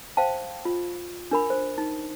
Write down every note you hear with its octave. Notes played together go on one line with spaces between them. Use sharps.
C5 F5 G5 A5
F4
D4 A#4 B5
C5
D#4